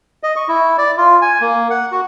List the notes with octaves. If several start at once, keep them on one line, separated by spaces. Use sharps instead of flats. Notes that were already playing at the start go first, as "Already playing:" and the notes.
D#5
C#6
E4
D5
F4
G#5
A#3
F#5
F#4